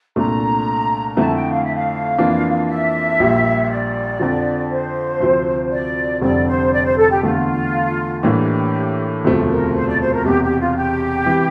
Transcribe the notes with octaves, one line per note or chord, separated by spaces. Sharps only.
C2 A#2 A3 D4 A#5
F2 D3 A3 E4 A5
G5
F5
E5
F5
F2 E3 A#3 D4 F4
E5
A#1 A#2 G3
D5
F2 D3 F3
C5
D2 C3 F3 C4
D5
F1 F2 D3 G3 C4 D5
C5
D5
C5
A4
G4
E2 D3 A3 F4
A2 E3 A#3 D4 G4
E1 D2 C3 F3 A3
A#4
C5
D5
C5
A#4
E1 E2 C3 G4
G4
F4
G4
C3 E3